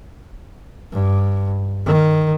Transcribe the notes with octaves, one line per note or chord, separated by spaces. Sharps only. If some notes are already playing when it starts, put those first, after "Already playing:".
G2
D#3